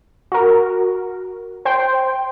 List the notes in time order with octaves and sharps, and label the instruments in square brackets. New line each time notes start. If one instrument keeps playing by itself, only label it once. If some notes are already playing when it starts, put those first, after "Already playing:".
[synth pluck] F#4 A#4
C5 G5 C6